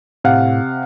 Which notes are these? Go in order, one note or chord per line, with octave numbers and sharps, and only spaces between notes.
A2 C3 F5 F#5